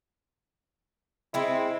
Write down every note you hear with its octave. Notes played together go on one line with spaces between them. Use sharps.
G#3 C4 E4